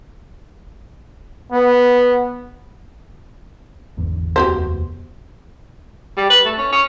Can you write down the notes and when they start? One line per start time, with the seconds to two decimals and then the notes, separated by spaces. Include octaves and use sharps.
1.52 B3
3.97 G#1 E2 D3
4.36 F1 D#2 B3 F#4 G4 C5
6.17 G3
6.30 B4
6.45 A3
6.58 C#4
6.72 C#4